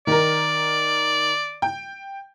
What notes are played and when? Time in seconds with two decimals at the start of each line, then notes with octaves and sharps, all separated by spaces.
0.07 D#3 A#4 D5
1.62 G5